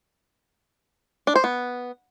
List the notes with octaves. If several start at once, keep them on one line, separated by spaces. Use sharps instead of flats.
D4
C5
B3